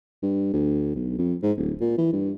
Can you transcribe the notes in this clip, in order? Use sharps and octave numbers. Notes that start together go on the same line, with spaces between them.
G2
D2
B1
F2
G#2
D1
A#2
E3
G2